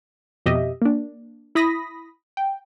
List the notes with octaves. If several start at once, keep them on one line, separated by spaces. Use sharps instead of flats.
F2 B2 G4 D#5 E5
A#3 D4
E4 B5 D#6 A#6 B6
G5